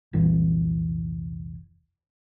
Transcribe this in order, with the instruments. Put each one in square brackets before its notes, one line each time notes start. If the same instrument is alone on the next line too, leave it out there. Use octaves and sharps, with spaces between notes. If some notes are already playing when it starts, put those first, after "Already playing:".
[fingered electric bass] F1 C2 A#2 E3